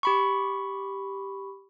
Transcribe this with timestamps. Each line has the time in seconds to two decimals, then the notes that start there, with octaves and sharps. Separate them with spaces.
0.03 G4 B5 C#6